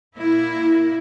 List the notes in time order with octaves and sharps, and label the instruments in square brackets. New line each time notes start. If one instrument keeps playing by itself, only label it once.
[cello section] A#2 A#3 E4